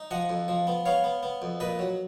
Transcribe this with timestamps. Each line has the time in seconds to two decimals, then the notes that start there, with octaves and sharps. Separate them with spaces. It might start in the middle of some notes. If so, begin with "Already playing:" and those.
Already playing: D#4
0.11 F3 D#5 F#5
0.29 F2
0.48 F3
0.67 B3
0.85 B3 C#5 F5
1.04 B3
1.23 B3
1.42 F2
1.60 A#2 B4 D#5
1.79 F#3